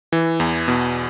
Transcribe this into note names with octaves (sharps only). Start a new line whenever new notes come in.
E3
E2
B2